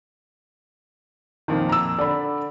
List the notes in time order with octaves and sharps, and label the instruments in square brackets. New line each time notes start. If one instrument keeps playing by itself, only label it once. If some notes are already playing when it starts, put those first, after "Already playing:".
[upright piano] F2 A#2 F3 [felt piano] D#3
[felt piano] A#5 E6
[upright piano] D3 [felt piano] D5 B5